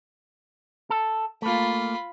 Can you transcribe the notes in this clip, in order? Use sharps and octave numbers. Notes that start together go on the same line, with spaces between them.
A4
A3 A#3 F4 B5